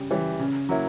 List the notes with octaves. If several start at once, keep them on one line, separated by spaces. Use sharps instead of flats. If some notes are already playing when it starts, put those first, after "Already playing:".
Already playing: C#3 G3
E3 G3
C#3
F#3 A#3 E4